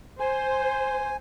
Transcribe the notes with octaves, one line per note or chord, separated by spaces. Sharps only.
C5 G#5